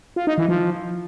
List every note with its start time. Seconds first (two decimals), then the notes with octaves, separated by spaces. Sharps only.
0.16 F4
0.27 D#4
0.38 E3
0.49 F3